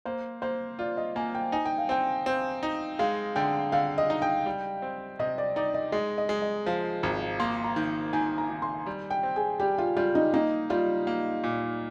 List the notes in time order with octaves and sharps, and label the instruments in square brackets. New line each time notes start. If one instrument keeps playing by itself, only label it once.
[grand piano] A#3 [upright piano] C5
[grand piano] A#3 [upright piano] C5
[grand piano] F4 [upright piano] D5
[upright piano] D#5
[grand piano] A#3 [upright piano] G#5
[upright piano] G5
[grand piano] D#4 [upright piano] G#5
[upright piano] G5
F5
[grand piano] C4 [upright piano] G5
[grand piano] C4
D#4
[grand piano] G#3 [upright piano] F5
[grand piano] D3 [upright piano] G5
[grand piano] D3 [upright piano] F5
[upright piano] D#5
[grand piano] D#4
[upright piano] G5
[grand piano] G3
C4
[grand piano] C3 [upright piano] D#5
[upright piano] D5
[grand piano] D#4 [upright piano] D5
[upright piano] D#5
[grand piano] G#3 [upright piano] D#5
[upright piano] D#5
[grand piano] G#3
[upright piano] D#5
[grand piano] F3 [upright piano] F5
[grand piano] G#1 [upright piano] A#5
[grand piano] A#3 [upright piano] C6
[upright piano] A#5
[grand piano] D#3
[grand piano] D#3 [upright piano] G#5
[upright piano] A#5
[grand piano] D#3
[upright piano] C6
[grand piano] G3
[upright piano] G5
[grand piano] C4
[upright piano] G#4
[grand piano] G3 [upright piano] G4
[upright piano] F4
[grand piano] G3 [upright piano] F4
[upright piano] D#4
[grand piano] A#3 [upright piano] D#4
[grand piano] G3 [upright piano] F4
[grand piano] A#3
A#2